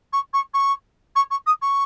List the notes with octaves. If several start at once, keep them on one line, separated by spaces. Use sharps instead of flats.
C#6
C#6
C#6
C#6
C#6
D#6
C#6